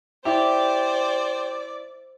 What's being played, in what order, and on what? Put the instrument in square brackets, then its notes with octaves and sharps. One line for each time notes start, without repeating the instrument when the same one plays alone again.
[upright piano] E4 [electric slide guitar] G4 [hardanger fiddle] C5 [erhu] D5